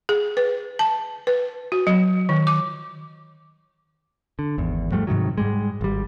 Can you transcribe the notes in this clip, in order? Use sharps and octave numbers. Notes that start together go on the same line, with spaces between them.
G#4
B4
A5
B4
F#4
F#3
D#3
D6
D3
G#1 E2
G#2 F3 G3 A3
G#2 C3 D#3 F#3
G#2 G3 G#3
G#1 G3